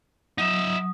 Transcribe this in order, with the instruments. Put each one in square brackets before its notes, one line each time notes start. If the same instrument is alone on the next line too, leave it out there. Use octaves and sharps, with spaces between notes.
[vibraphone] F#3 D#6 [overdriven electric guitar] D#4 E5